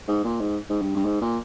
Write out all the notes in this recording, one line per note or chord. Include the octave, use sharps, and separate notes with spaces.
G#2
A#2
G#2
G#2
G2
G2
G#2
A#2